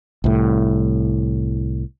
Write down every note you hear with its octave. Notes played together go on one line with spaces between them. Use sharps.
C2 A2